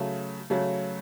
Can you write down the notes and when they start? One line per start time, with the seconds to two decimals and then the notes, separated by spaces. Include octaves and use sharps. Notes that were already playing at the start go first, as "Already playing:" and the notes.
Already playing: C#3 F#3 A3
0.50 C#3 F#3 A3